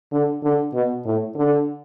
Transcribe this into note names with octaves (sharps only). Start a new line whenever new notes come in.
D3
D3
B2
A2
D3